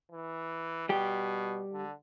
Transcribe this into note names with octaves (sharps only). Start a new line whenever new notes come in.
E3
B2 G3 G4
D3